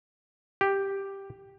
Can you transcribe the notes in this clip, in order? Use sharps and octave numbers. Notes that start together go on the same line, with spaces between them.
G4